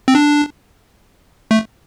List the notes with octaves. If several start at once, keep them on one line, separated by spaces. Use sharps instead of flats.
C4
D4
A3